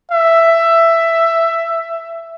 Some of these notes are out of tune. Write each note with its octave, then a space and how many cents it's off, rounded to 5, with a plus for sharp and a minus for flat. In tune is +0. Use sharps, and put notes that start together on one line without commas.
E5 +10